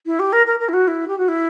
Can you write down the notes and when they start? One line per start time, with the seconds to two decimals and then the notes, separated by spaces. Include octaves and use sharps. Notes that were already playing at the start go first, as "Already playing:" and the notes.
0.06 E4
0.19 G4
0.32 A#4
0.46 A#4
0.59 A#4
0.68 E4
0.73 F#4
0.87 E4
1.08 G4
1.18 F#4
1.28 E4